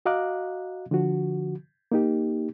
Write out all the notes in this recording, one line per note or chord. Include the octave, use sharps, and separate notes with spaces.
F#4 D#5 F5 A#5 D6 F#6
D3 F3 F#4
A#3 D#4 G4